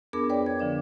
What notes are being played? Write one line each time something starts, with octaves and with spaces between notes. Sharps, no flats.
F2 B3 D4 G#4 A#4 D6
B4 C#5 D5 G5
G#6
D3 F3 D4 D5